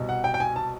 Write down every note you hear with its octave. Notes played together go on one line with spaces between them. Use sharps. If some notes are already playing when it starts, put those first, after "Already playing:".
Already playing: C2 B2
F#5
G5
G5
G#5
A5